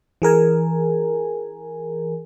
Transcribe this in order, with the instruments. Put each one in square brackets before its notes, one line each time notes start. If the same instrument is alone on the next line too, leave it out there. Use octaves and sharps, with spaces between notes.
[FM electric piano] E3 G#4 A#4 G#5